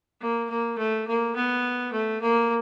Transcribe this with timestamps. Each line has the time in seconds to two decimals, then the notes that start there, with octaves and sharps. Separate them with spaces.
0.21 A#3
0.50 A#3
0.78 A3
1.07 A#3
1.35 B3
1.93 A3
2.21 A#3